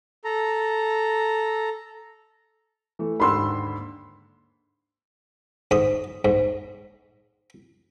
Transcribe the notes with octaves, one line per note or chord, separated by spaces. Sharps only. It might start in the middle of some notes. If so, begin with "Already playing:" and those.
A4 A#5
E3 A3
D#2 G#2 D3 B5 C6 E6
G#2 D#6
G#2